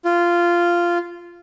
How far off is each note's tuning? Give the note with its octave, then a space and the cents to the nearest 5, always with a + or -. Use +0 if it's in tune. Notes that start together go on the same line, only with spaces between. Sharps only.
F4 -10